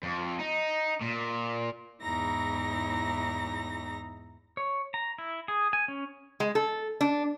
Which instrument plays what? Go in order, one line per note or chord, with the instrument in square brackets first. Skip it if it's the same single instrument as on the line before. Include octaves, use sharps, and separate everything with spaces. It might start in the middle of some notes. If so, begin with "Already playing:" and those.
[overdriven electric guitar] F2
D#4
A#2
[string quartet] E2 G#2 D#4 E4 A#5 A#6
[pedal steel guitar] C#5
A#5
E4
G#4
G#5
C#4
[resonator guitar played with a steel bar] G#3
A4
D4